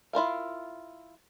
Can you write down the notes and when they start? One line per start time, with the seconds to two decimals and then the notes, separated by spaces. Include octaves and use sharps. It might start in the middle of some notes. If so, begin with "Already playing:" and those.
0.13 E4 F4 A#4 F5